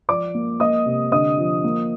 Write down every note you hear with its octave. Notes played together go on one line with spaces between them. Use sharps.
F3 D5 D6
A#3
A#3 D#5 D#6
C3
D3 D#5 D#6
F3
A#3